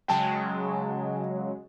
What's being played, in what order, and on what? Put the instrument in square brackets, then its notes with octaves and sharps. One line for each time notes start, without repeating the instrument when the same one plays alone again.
[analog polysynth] C#3 F#3 G#3 [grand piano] G5 A5